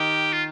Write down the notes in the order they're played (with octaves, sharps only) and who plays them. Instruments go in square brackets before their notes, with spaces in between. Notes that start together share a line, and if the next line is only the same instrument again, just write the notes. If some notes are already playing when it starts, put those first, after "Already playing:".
Already playing: [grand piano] D#3 D#4 [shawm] G4
[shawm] F4